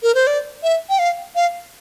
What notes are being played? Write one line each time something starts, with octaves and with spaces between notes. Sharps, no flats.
A#4
C5
D5
E5
G5
F5
F5